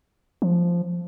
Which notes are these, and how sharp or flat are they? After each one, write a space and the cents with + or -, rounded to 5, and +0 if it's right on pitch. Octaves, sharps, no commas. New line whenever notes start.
F3 -5